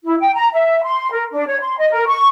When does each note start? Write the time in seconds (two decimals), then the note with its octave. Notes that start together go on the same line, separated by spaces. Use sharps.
0.05 E4
0.20 G5
0.34 A#5
0.52 E5
0.83 C6
1.11 A#4
1.32 D4
1.46 C#5
1.59 C6
1.78 D#5
1.91 A#4
2.06 C#6